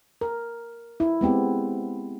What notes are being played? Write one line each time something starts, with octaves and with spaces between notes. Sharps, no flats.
A#4
E4
G#3 B3 C4 G4